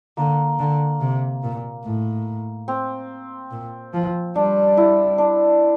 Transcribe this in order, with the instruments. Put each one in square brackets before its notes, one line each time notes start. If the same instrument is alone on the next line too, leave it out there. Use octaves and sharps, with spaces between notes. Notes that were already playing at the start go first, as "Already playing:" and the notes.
[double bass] D3 [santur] A#3
[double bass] D3
C3
A#2
A2
[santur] C4
[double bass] A#2
F3
[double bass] G3 [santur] D4
[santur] E4
D4